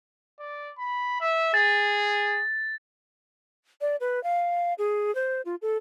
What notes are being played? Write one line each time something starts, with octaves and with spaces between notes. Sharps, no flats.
D5
B5
E5
G#4 A6
D5
B4
F5
G#4
C5
F4
A4